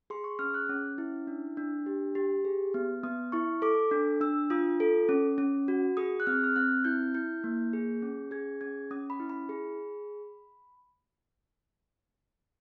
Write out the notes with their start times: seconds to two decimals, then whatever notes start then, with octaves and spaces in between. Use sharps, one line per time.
0.10 G#4 C6
0.24 C#6
0.39 C#4 F6
0.54 F#6
0.69 C#4
0.98 E4
1.27 D4
1.57 D4
1.86 G4
2.15 G4
2.45 G#4
2.74 B3
3.03 B3 D#6
3.32 E4 C#6
3.62 A4 D6
3.91 D4
4.21 D4 E6
4.50 F4 D#6
4.80 A4
5.09 C#4
5.38 C#4
5.68 F#4
5.97 G#4 D#6
6.20 F#6
6.27 C4 F6
6.44 F6
6.56 C4 F#6
6.84 E4 G6
7.14 E4 G6
7.44 A#3
7.73 G#4
8.02 C#4
8.31 G#4 G#6
8.61 C#4 G#6
8.91 C#4 D#6
9.10 B5
9.20 E4
9.29 B5
9.49 G#4